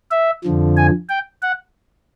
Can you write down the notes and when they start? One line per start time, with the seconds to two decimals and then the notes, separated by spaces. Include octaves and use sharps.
0.11 E5
0.44 F2 D3 F3
0.77 G#5
1.09 G5
1.42 F#5